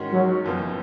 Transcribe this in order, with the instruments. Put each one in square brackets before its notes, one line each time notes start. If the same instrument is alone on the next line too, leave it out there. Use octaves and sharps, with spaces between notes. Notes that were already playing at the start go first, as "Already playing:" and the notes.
Already playing: [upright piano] G#2 D#3 G#3 C#4 F#4
[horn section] F#3
[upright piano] F#1 F#2 F3 B3